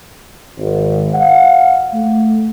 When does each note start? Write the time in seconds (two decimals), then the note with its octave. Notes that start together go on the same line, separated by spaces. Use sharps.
0.58 G#1
1.14 F5 F#5
1.94 A3